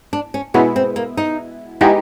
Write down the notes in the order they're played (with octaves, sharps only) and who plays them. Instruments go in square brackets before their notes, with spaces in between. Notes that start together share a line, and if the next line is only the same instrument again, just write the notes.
[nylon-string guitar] D4
C#4
[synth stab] B2 G#3 B3 E4 [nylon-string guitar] C#4
[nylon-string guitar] C4
A#3
D#4
[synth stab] G#3 B3 D#4 G4 [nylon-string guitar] E4